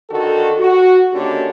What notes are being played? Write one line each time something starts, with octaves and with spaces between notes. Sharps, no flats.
D3 D#3 F#4 A4
F#4
D3 D#3 A#3 C#4 F#4 G4